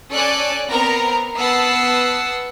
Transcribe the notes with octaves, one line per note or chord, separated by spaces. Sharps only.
C#4 A4 D5 G#5 F#6
B3 C4 A#4 A#5
B3 F#5 A5 E6 C7